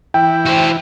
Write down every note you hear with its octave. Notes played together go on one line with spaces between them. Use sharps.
E3 E4 G5
F#4 C5